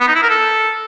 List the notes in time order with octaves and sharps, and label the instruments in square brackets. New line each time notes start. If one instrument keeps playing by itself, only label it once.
[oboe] B3
D#4
E4
A#4
A4